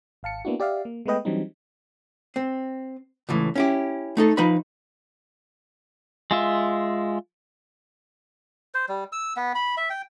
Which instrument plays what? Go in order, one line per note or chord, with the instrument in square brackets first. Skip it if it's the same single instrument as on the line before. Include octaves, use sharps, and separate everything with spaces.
[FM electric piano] G#1 F5 A5 C#7
A#3 B3 D4 E4 F#4
G4 D5 E5 F5
A#3
G#3 A3 B3 B4 D#5 G5
E3 F#3 G3 C4 D4 D#4
[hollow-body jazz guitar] C4
C#2 A2 E3
C#4 E4 G4
A3 D#4 A4
F3 D#4 B4 B5
[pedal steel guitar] G#3 F4 E5
[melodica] C5
G3
E6
B3
B5
E5
G5